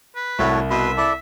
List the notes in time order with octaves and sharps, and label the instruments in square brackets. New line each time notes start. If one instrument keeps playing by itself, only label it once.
[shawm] B4
[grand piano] C2 [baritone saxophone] A2 [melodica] F#4 C#5 A5
[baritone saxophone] B2 [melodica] B4 C6 [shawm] E5
[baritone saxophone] E4 [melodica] A4 D5 A5